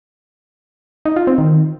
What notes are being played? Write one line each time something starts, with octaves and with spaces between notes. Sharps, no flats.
D#4
F4
C4
D#3